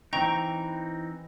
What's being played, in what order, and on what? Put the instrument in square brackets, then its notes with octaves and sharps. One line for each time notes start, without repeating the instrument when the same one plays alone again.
[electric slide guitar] E3 C4 D#4 [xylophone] G5 A#5 C#6